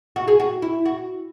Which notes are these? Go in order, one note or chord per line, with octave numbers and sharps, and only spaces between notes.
F#4
G#4
F#4
E4
F#4